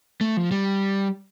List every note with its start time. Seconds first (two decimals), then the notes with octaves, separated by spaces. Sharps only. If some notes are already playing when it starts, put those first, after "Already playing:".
0.21 A3
0.37 F3
0.51 G3